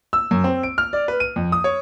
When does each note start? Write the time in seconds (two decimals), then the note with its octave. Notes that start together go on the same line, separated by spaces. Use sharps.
0.13 E6
0.31 F#2
0.44 C4
0.63 D7
0.78 F6
0.93 D5
1.08 B4
1.20 D#7
1.36 F2
1.52 D#6
1.64 C#5